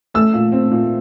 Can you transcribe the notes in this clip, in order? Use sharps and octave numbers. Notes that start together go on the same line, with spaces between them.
A3 E6
A#2
C4
A#2